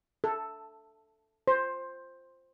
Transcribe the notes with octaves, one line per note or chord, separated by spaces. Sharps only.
A4
C5